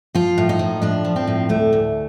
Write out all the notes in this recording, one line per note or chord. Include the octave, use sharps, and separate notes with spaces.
F3 F4
A2
D#4
F3
A2 D4
F3
C4
A2
D2 A3
D2